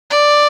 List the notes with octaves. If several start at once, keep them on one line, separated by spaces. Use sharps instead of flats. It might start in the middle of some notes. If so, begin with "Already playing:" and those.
D5